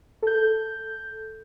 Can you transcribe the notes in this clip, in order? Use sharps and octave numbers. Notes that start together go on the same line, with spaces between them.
A4 G6